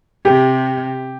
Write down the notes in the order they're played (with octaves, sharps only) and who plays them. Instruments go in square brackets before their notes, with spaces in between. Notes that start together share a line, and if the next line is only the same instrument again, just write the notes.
[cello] C3 [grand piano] G4